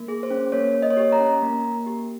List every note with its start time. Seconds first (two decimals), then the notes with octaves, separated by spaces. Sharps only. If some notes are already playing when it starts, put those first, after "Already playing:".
Already playing: A#3
0.08 G#4
0.23 C5
0.30 C#4
0.52 A#3 C#5
0.75 A#3
0.82 D#5
0.90 C#5
0.97 G4 D#5
1.12 A#5
1.20 C#4
1.42 A#3
1.64 A#3
1.86 G4